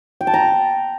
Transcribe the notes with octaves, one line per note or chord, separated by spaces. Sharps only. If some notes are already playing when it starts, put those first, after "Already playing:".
G5
A5
A#5